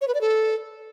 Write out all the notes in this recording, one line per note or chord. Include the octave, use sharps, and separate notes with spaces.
C#5
B4
D5
A4